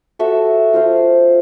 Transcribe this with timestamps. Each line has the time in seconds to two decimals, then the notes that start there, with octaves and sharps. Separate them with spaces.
0.19 F#4 A4 E5
0.73 F4 C5 F5